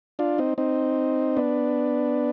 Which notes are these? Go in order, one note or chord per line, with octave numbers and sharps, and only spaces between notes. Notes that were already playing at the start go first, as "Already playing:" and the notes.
D4 F4
C4 D#4
C4 D#4
B3 D4